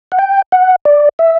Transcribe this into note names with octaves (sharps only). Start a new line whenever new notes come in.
F#5
G5
F#5
D5
E5